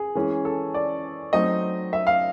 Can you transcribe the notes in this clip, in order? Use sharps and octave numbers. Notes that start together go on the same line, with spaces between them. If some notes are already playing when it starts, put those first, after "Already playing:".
Already playing: G#4
E3 G#3 C#4
A4
D5
F#3 A3 C4 D#4 D#5
E5
F5